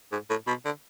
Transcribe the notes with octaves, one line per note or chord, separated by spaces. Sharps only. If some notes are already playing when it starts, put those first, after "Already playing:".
G#2
A2
B2
D3